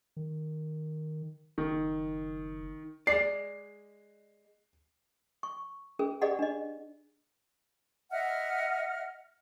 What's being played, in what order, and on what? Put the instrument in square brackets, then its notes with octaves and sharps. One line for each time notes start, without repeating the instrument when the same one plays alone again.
[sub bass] D#3
[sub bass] F#1 [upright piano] D#3
[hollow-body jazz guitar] G#3 D5 [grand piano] C7
[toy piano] C#6
C#4 G#4 B4
G4 G#4 B4 D5 D#5 F#5
D4 D#5
[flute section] D#5 E5 F#5 F6